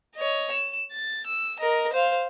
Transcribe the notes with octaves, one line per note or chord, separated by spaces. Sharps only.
C#5 D#5
E7
A6
E6
A#4 D#5
C5 F5